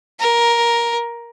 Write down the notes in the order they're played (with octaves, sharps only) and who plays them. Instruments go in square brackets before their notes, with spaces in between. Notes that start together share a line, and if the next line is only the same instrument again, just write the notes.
[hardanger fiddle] A#4